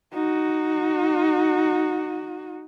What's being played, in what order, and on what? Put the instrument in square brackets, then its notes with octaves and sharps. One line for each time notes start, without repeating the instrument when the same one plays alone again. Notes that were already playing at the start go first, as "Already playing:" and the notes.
[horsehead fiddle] D#4 F#4